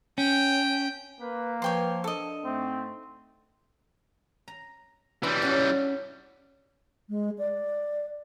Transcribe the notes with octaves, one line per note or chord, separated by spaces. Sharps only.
C#4 G5
A#3 B4
F3 B4 C#5 G5 C6
D4 A4 D#5
G#2 A3 C4
A#5
E3 G3 D4 F4 G5
C#4 F#4
G#3
D5